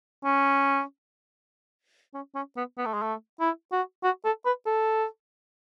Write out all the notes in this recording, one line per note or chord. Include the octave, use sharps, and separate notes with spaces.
C#4
C#4
C#4
B3
B3
A3
G#3
A3
E4
F#4
F#4
A4
B4
A4